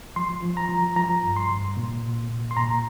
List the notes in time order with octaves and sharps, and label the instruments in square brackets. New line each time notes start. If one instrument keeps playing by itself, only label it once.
[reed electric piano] F3 C6
F3
A#5
F3
F3 A#5
G2
C6
G2
A#2
A#2
A#2
C6
A#2 A#5